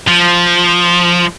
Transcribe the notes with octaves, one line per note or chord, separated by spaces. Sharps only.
F3